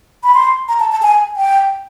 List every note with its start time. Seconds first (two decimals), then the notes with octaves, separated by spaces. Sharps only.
0.24 B5
0.35 C6
0.68 A#5
0.80 A5
0.91 A5
1.02 G#5
1.37 G5